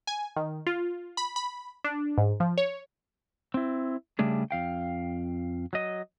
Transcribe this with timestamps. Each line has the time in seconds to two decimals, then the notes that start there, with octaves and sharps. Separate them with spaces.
0.07 G#5
0.36 D#3
0.67 F4
1.17 B5
1.36 B5
1.84 D4
2.18 G#2
2.40 F3
2.58 C#5
3.54 C4 E4
4.19 C#3 G3 A3 D4 G#4
4.51 F2 F5 G5
5.73 F#3 D#5